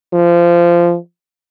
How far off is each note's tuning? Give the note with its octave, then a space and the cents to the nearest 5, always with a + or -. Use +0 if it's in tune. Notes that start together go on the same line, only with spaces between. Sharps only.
F3 -20